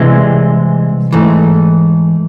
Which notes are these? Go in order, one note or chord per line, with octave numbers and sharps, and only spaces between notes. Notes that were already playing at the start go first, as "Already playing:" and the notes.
Already playing: C2 C3 E3 G#3
G#2 E3 A3